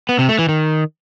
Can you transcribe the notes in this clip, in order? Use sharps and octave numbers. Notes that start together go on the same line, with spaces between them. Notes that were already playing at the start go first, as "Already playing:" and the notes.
B3
C3
A3
E3
D#3